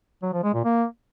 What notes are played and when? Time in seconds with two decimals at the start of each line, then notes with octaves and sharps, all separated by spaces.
0.22 F#3
0.33 F3
0.43 G#3
0.54 A#2
0.65 A#3